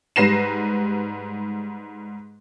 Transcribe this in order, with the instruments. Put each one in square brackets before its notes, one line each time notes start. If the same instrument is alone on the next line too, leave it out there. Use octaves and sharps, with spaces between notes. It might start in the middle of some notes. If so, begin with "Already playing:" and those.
[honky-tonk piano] G#2 G3 B4 A#6 C7 E7